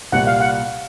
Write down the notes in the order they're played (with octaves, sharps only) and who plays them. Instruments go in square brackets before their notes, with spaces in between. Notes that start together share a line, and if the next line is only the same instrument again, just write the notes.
[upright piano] C2 A#2 G3 [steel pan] F#5
[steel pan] F5
F#5